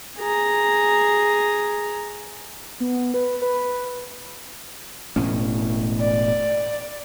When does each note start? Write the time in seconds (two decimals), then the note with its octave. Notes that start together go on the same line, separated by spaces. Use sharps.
0.18 G#4 A#5
2.80 B3
3.14 B4
3.42 B4
5.16 E1 A2 C#4
6.01 D5